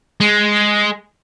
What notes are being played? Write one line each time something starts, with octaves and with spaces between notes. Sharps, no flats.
G#3